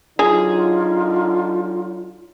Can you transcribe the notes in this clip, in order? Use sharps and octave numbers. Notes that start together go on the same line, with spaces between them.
D3 F#3 D#4 F4 G#4